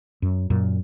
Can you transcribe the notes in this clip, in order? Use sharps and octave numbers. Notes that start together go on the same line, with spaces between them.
F#2
F#2 A#2